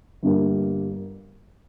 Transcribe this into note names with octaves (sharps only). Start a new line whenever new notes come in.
G1 G2 D3 G3 A#3